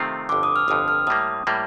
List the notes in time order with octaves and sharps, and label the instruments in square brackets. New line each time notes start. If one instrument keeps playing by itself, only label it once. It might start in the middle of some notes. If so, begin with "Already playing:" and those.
Already playing: [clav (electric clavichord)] C3 D#3 A3 C4 F4
[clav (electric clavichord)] G1 F2 D3 [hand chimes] D6
[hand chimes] D#6
F6
[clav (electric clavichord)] G1 F2 D3 [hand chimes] D#6
[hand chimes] F6
[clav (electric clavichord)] A2 G3 A#3 [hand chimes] D#6
[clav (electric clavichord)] A2 G3 A#3